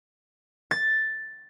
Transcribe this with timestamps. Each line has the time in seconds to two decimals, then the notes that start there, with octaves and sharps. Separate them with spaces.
0.71 A6